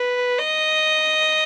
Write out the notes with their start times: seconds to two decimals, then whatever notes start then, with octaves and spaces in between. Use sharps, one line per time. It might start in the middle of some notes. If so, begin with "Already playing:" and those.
Already playing: B4
0.39 D#5